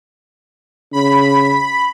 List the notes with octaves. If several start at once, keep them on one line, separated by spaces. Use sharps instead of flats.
C#3 B5